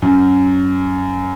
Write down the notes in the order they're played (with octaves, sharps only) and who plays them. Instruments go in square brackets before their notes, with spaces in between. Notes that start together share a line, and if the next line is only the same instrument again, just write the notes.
[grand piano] F#2